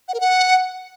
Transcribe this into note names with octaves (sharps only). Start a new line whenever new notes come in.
F#5
A#4
F#5